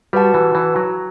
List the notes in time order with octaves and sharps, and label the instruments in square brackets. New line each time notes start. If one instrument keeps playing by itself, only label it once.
[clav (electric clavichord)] G3 [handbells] F#4 B4 F#5 A5
[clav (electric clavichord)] E3
E3
F#3